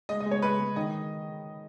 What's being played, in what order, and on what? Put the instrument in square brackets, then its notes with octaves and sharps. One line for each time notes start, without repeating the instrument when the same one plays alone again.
[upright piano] G#3 D#5
D#5
G#3
C#5
G#3 B4
G#3
D#3 D#5